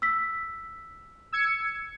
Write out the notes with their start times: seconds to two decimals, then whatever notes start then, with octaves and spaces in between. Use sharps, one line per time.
0.02 E6 B6
1.32 E6 G#6 C#7